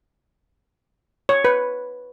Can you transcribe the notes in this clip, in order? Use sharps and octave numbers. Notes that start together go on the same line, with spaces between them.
C#5
B4